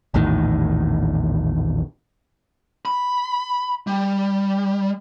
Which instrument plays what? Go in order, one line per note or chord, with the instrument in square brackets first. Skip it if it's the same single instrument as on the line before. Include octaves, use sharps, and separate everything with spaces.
[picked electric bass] A#1 E2 A2 D#3
[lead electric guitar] B5
G3